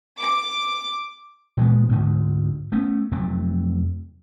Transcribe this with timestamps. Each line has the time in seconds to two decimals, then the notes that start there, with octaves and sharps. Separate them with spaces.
0.19 D6
1.57 A#2 E3 G#3 B3
1.89 D2 G#2 D3
2.72 A3 B3 C#4
3.12 F2 C3 F#3 A3